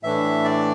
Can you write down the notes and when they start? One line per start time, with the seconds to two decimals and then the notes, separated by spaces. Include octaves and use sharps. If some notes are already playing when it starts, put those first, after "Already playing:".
0.03 A2 E3 A3 D4 E5
0.44 D5